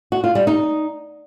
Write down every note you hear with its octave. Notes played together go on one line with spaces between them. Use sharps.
F#4
F4
G3
D#4